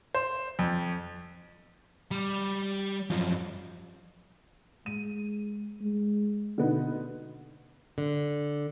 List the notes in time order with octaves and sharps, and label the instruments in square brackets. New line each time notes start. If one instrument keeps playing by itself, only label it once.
[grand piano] C5
F2
[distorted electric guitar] G3
F#2 F3
[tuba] G#3 [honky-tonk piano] D#7
[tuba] G#3
[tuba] B2 [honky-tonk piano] D3 B3 D#4
[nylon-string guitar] D3